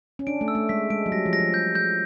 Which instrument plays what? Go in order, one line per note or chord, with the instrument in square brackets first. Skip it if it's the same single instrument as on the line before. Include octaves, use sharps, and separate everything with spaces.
[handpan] C#4
[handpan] D4 [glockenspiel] D7
[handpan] A3
[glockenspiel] E6
[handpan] A3
[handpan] G#3 [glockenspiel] B6
[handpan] G#3 [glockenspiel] D7
[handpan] F#3
[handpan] G3 [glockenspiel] A#6
[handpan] F3
[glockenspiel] A#6
[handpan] F3
[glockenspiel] G6
G6